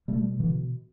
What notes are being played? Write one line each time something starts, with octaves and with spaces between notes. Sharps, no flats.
B2 G3 A3
B2 D3 E3